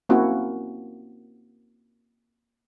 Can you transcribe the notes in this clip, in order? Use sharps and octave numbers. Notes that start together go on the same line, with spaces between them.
A#3 C4 C#4 E4 F#4